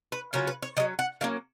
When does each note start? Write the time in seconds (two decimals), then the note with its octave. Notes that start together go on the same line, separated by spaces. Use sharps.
0.12 B4
0.33 C#3 F#3 C#4 F4 A#4
0.47 B4
0.62 C#5
0.77 D#3 F#3 C#4 D#5
0.99 F#5
1.21 D#3 F#3 A#3 C#4 F5